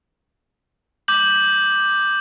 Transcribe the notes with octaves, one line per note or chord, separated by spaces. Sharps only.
D6 G6 F#7